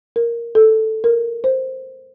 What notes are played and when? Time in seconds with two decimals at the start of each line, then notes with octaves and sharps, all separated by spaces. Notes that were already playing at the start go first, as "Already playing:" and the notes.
0.16 A#4
0.55 A4
1.04 A#4
1.44 C5